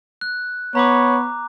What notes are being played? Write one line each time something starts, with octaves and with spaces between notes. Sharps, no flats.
F#6
B3 C#5 A#5 D6